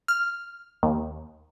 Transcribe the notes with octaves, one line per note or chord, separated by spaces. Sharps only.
F6
D#2